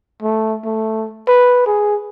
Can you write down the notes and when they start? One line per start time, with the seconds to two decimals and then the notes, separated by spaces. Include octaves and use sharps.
0.22 A3
0.65 A3
1.28 B4
1.66 G#4